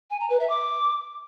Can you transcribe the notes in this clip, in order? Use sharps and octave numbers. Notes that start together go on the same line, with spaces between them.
G#5
A#5
B4
E5
D6